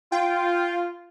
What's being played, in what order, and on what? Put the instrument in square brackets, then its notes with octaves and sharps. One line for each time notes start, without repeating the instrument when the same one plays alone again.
[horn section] F4 [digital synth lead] G5